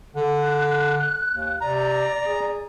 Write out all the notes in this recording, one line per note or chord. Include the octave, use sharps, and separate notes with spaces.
D3 F#6
D#2
C3 D5 A#5
G#4